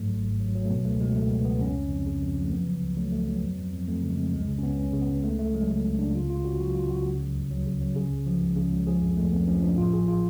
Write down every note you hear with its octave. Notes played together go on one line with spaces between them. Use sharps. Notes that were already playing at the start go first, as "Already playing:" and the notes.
Already playing: G#2 F#3 A3
G#1
G#1
F#3
F#3
A3
B2 B3
C#2 A3
B2 G#3
C#2 A3
C#2 B3
C#2 B3
F2 C#4
C#3
F2
C#3
F2
F3
A3
F#3 B3
C#3
C#2
F#3 A3
C#2 A3
F#3 B3
F2
F2
F2
F2 A3
C#3
G#3
F2
C#2 G#3
C#3
C#4
C#2 B3
C#2 C#4
C#3
B3
C#2
C#2 A3
C#3 A3
F#3 G#3
C#3 A3
C#2
C#3 D4
C#2 F4
C#2 F4
C#3 F#4
F#3 F#4
C#3 F4
C#2 F#4
C#3
F#3
D2
F#3
C#3
F#3
C#3 G#4
C#2
F3
C#2
C#3
C#2
F3 G#4
F2
F2 A3
F2 B3
F3 C#4
F3 D4
A2 F4
A1 G#4
F4